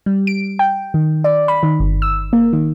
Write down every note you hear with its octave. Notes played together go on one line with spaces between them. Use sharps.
G3
D7
G5
D#3
D5
B5
D#3
G1
E6
A#3
D#3